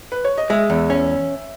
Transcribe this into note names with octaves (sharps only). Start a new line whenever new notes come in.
B4
C#5
D#5
G#3 E5
E2
C#4